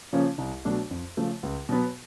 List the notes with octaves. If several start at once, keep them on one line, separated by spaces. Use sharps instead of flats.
C#3 F3 A#3 C#4
C2
B2 F#3 A3 D4
F2
C#3 F3 A3
C#2
B2 F#3 B3